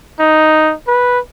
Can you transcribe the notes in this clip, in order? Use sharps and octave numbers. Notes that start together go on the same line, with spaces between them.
D#4
B4